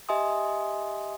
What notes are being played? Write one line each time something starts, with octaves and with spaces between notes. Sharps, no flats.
G4 D#5 E5 G#5 C6 D#6